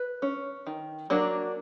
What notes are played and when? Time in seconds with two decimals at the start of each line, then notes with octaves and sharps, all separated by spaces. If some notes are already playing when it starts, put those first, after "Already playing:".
Already playing: B4
0.22 C#4
0.67 D#3
1.10 F#3 A#3 D4